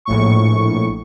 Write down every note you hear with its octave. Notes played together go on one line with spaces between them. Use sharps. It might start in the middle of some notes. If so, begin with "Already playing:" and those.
A#1 A2 C#6